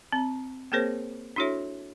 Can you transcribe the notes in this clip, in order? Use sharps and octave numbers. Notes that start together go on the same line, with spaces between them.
C4 A#5
A#3 C4 G#4 A#4 C5 C#5
D4 E4 F#4 A4 C#5 E5